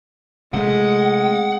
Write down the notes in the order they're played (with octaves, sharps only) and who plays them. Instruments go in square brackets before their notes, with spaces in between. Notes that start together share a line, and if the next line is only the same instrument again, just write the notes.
[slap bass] C3 A3 [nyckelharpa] G#3 [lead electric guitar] F#5